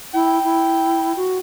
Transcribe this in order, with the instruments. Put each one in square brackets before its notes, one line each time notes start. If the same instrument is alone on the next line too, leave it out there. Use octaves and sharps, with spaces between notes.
[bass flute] E4 [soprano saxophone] G5
[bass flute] E4
F#4